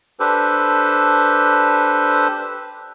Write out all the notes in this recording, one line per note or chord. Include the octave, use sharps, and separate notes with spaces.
D4 G4 A4 B4 C5